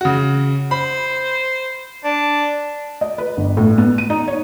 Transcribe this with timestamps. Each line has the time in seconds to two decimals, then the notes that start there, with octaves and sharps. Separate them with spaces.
0.01 C#3 F#4
0.71 C5 B5
2.04 D4
3.01 D#5
3.18 B4
3.37 G1
3.57 A2
3.78 B3
3.98 D#7
4.10 D#4
4.28 C#5